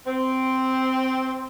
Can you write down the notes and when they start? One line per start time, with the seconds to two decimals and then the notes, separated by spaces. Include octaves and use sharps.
0.06 C4